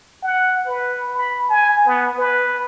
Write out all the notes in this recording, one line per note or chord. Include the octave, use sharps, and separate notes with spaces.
F#5
B4
B5
G#5
B3
B4